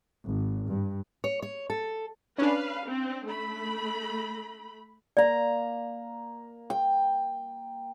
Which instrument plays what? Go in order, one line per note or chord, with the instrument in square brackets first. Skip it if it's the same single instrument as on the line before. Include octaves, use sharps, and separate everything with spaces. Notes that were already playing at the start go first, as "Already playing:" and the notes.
[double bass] G#1
G2
[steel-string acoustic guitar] C#5
C#5
A4
[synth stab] C#4 D4 [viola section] B4 F5
[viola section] C4
A3 B5
[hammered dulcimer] A#3 A#5 [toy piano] D5
[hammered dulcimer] G5